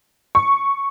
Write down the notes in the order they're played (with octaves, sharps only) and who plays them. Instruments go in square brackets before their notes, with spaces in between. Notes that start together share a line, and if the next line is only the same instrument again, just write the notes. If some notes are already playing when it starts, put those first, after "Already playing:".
[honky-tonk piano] C#6